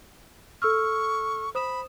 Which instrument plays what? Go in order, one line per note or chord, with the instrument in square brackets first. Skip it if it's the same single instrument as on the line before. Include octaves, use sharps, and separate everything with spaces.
[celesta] A4 E6 F6 [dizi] C#6
[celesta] C5 D#6 E7 [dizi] B5